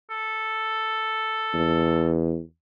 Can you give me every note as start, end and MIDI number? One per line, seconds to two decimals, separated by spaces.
0.10 2.11 69
1.54 2.40 40